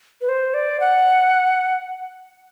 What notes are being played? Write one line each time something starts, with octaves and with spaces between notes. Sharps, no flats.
B4
C5
D5
F#5